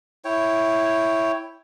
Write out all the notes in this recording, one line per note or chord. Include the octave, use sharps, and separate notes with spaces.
E4 C#5 G5